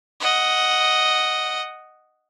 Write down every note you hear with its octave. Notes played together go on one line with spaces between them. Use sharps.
D#5 F#5